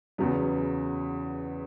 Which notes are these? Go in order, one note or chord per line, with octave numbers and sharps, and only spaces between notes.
E2 C#3 F#3 B3